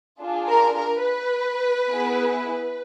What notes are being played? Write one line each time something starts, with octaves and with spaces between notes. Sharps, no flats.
D4 F4 G#4
A#4
A#4
B4
B3 E4 G#4